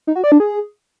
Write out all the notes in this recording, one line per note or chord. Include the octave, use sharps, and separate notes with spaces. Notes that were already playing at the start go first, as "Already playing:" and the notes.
D#4
F#4
D5
D4
G#4